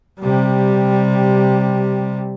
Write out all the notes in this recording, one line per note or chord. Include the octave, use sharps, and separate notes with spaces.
C3 G3